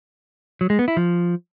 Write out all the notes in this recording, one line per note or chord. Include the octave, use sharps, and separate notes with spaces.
F#3
G#3
B3
E4
F3